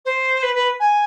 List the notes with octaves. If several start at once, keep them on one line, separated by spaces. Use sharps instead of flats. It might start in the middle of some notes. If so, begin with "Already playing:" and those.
C5
B4
B4
G#5